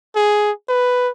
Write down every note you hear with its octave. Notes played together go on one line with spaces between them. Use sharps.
G#4
B4